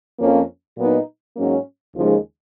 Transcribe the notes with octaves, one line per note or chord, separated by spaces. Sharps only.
F2 F3 A#3 C#4
A#2 F#3 B3 D#4
G#2 F#3 A#3 C#4
D#2 C#3 F3 G#3 D#4